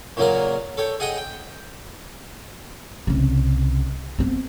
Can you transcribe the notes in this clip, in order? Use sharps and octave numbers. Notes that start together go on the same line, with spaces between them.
A#2 C#3 F#3 A#3 A#4
A4 C#5 G5
G#4 D#5 F#5 G5 D#6
G5
C2 C#3
B3 C4